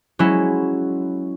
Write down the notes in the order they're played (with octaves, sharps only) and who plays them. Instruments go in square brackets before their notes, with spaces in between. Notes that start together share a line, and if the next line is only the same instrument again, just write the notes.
[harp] F#3 G#3 C#4 E4